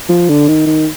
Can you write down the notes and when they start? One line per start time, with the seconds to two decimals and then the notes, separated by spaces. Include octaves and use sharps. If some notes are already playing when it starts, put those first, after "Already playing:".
0.09 F3
0.29 D3
0.48 D#3
0.66 D#3